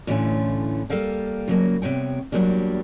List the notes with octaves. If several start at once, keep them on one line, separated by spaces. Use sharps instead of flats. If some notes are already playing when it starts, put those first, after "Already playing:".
A2 D3 E3 A3 C#4 F4
G3 A#3 A4 F5 G5
C#3 F#3 A#3
C3 B3 C#5 G5
E2 G2 F#3 G3 A#3 D4